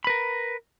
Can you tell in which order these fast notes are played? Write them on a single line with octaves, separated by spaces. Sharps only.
B5 B4 A#4